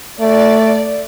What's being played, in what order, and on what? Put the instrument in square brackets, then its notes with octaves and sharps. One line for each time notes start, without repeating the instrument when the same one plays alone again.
[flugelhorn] A3 [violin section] D5